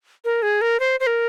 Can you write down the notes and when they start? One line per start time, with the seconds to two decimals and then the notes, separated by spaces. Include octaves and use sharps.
0.25 A#4
0.42 G#4
0.61 A#4
0.80 C5
1.00 C5
1.07 A#4